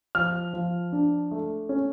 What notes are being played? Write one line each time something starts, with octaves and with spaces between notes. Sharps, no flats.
F3 F6
F3
D4
A3
C#4